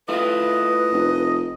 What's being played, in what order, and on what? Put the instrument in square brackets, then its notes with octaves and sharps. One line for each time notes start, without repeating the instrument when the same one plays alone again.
[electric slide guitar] A3 E4 F4 [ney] B4 [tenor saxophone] D#5
[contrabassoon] F1